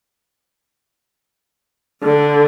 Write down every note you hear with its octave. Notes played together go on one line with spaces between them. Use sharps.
D3